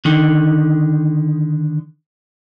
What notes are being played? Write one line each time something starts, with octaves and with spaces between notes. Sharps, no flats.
D3 D#3